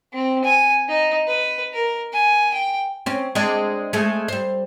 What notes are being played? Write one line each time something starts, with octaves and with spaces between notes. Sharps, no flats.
C4
G#5
D#4
B4
A#4
G#5
G5
C4 C#4
G#3 C4 D4
G#3 A3
G3 C5